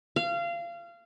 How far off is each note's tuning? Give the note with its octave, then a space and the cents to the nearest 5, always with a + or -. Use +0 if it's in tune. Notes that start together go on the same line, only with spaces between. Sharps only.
F5 -25